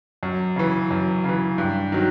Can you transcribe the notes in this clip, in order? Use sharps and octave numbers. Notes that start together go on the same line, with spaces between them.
F#2
C#3 E3
F#2
C#3 E3
G2
D#3 F#3